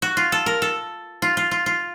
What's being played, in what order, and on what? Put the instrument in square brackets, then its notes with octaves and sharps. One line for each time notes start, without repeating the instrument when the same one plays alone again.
[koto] F#4
F4
A4
A#4
A4
F4
F4
F4
F4